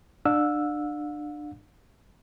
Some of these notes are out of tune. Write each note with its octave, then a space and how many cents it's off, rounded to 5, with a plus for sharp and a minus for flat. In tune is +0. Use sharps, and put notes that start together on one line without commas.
D4 +25 F5 +45 E6 +0